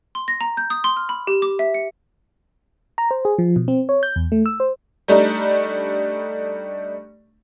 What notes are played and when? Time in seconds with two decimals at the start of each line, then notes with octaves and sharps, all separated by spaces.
0.15 C6
0.28 A#6
0.41 A#5
0.57 G6
0.70 D#6
0.84 C6
0.97 F6
1.09 B5
1.27 G4
1.42 D6
1.59 E5
1.74 C#7
2.98 A#5
3.11 C5
3.25 G#4
3.39 F3
3.56 B2
3.68 C4
3.89 C#5
4.03 G6
4.16 E2
4.32 A3
4.46 E6
4.60 C5
5.08 G3 A3 D4 D#4